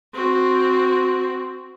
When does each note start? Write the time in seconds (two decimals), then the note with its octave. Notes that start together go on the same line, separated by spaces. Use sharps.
0.14 C4 F#4